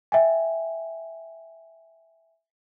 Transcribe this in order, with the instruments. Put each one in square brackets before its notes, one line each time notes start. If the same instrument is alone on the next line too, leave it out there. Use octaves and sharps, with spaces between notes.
[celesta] E5 G5 G#5